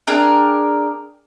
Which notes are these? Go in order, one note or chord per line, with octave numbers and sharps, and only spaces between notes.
D4 G#4 A#4 G5